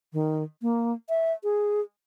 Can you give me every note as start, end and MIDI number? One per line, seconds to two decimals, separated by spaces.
0.13 0.43 51
0.62 0.93 58
1.09 1.33 76
1.44 1.81 68